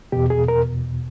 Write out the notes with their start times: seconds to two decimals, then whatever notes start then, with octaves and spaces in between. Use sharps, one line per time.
0.12 E2 B2 G4
0.30 G#4
0.48 A#4